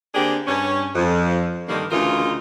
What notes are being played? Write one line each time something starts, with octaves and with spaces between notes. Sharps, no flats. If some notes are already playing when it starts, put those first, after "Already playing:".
D3 A#3 C4 D4 G4 G#4
G2 C#4
F2
G2 D3 D#3 G3 A#3
D2 C#3 E3 D#4 F4 A#4